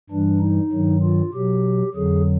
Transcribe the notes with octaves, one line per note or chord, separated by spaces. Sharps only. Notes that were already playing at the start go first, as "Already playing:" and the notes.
G2 E3 G3 D4
D#4
G2 D#3 F#3
F4
B2 F#3 G4
F2 D3 F#3 G#4